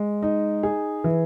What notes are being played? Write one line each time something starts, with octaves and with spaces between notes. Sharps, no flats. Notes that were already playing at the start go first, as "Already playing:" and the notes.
Already playing: G#3
D#4
G#4
E3